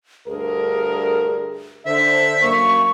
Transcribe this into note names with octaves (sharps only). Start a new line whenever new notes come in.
D2 G2 G#4 A#4
D3 C5 E5
F#2 A#3 C#6